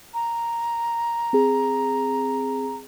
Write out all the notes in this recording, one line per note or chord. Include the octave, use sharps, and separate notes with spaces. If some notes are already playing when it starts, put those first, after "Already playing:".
A#5
C4 G#4